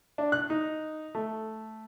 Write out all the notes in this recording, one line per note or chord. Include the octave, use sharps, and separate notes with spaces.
D4
F#6
D#4
A3